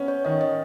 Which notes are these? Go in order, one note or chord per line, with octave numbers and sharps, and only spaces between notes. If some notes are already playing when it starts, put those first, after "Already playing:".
Already playing: B3 C#4
C#5
D#3 D#5
D#5